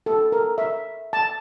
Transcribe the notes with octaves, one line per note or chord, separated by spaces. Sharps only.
A4
A#4
E5
A5